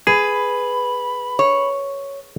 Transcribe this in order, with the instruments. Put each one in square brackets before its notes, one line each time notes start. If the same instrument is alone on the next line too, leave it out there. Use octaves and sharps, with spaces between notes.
[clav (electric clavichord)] G#4 [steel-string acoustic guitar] B4 [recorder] B5
[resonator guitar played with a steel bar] C#5